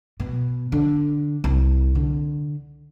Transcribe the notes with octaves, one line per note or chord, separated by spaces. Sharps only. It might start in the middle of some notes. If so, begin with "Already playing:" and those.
B2
D3
C2
D3